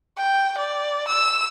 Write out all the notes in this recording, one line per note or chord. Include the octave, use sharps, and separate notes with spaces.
G5
D5
E6